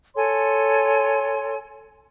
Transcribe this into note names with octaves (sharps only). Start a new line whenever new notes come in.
A4 C#5 G#5 C6